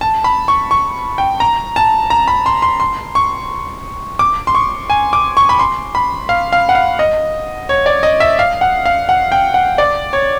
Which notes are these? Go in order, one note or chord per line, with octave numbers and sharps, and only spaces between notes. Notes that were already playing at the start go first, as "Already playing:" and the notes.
A5
B5
C#6
C#6
G5
A#5
A5
A#5
B5
C6
C6
C6
C#6
D6
C6
C#6
G#5
D6
C#6
B5
C6
B5
F5
F5
F#5
F5
D#5
C#5
D5
D#5
E5
F5
F#5
F5
F#5
G5
F#5
D5
C#5